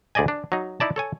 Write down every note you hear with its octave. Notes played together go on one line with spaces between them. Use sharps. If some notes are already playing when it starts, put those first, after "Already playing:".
D2 G#4 D5 D#5 G#5
D4
F#3 D#4
D#4 E4 D5 A5
A4 C#5 G#5